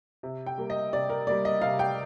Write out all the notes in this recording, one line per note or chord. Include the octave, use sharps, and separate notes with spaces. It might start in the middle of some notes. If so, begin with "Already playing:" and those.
C3
G5
G3 A#3
D#5
C3 D5
A#4
G3 A#3 D5
D#5
C3 F5
G5